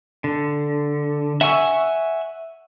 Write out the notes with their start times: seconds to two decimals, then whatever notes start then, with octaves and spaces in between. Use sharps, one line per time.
0.24 D3
1.41 E5 F#5 G#5 C#6 E6